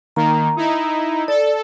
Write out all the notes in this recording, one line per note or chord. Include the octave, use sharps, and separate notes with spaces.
D#3 A#3 A#5
D#4 E4
A4 D5